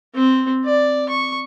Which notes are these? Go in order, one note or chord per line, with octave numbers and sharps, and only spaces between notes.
C4
D5
C#6